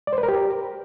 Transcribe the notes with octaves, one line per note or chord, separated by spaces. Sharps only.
D5
C5
B4
A#4
G4